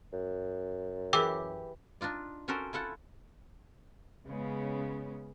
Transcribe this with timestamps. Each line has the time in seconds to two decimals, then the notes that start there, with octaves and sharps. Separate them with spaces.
0.13 F#2
1.13 E3 G4 G#4 A#4 G5 D6 E6
2.01 D4 D#4 F4 D5
2.48 C#4 F#4 A4 A#4 C5
2.73 E4 F4 A4 F#5
4.27 C#3 G#3 B3 C#4